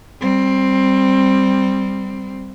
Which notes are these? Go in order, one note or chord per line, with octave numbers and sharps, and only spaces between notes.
G3 C4